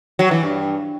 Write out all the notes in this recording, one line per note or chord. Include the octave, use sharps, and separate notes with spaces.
F#3
E3
G2